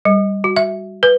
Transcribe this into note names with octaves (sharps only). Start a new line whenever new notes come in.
G3
F#4
E5
B4